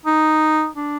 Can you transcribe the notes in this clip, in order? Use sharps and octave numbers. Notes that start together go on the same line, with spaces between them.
D#4
D4